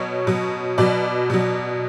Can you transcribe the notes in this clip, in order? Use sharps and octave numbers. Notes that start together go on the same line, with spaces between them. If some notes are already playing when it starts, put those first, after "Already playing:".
Already playing: B2 F#3 C#5
B2 F#3
B2 F#3 D5
B2 F#3